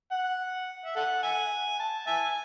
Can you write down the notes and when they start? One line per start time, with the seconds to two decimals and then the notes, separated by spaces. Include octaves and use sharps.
0.11 F#5
0.85 E5
0.96 A4 F#5
1.23 E5 G#5
1.80 A5
2.07 E5 G#5